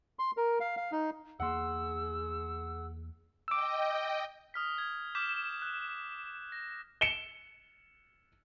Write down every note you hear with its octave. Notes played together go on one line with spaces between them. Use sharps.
C6
A#4
F5
F5
D#4
E2 A#3 G#4 F#5 C6 E6
D#5 G5 D6 E6
D#6 F6 B6
G#6
D6 F6 G6 B6 E7
F#6
A#6
C#7 E7 G7